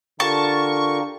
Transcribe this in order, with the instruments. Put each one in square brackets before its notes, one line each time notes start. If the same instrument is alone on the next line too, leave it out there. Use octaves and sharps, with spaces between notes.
[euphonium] D3 [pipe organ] F4 G4 A#4 [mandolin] A5 [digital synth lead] C#6